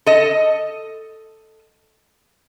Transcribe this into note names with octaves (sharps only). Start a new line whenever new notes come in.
A4 D#5